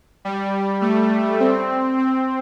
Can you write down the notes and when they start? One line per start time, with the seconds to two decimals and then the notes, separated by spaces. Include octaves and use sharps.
0.25 G3
0.82 A3
1.40 C4
1.98 C4